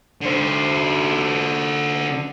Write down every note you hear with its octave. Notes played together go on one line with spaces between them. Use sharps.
D3 C5